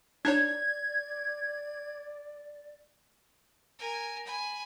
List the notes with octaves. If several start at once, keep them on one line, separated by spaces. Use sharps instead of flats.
D4 D#4 C#5 D5 G#6
A#4 G#5
G#5 B5